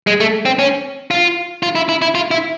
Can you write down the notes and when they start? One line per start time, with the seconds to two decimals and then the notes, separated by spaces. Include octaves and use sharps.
0.07 G#3
0.20 A3
0.45 C4
0.59 C#4
1.11 F4
1.63 F4
1.75 E4
1.89 E4
2.02 E4
2.15 F4
2.31 E4